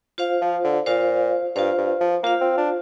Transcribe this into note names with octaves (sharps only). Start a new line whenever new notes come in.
F4 C5 F5
F3
D3
A#2 F4 C5 F5
G2 F4 C5 F5
G2
F3
A#3 F4 C5 F5
C4
D4